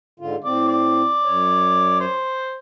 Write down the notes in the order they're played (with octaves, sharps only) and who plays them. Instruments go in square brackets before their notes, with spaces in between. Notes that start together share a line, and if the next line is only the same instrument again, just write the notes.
[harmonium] G#2 D3 F4
[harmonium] A2 C4 [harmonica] D5
[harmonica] D5
[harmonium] F#2 C#5
[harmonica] C5